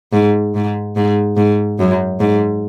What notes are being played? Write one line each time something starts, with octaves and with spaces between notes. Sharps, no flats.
G#2
G#2
G#2
G#2
F#2
G#2